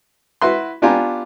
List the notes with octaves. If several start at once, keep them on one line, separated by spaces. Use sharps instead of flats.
E4 F#4 B4 E5 C6
B3 D4 F4 G4 G#5 A#5